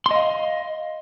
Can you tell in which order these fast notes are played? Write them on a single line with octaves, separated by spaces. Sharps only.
C6 D#5 F5